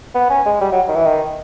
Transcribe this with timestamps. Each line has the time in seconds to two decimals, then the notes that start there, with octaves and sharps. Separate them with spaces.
0.15 B3
0.30 C#4
0.46 G#3
0.61 G3
0.72 F#3
0.88 D#3
0.95 E3
1.06 D#3